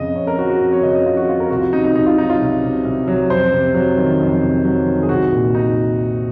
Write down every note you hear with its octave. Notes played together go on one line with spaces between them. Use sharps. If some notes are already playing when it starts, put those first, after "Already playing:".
Already playing: F2 C#3 D#5
F2 C#5
A#4
F3 F#4
F#4
F2
C#5
C#3 D#5
D#5
F2 F4
F#4
F3 F4
A#4
C2 F#4
F4
C3 D#4
D#4
C2 D#4
F4
F#3 D#4
F4
C2
C3
C2
F#3
F2 C5
C3
F#3
D#3
F2
C3
F#3
D#3
G#4
C2 F#4
A#2
D#4